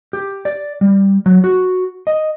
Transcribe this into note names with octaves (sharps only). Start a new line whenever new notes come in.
G4
D5
G3
F#3
F#4
D#5